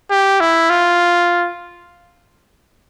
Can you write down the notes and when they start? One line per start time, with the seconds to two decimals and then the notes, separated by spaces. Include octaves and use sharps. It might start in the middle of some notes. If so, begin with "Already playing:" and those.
0.11 G4
0.41 E4
0.70 F4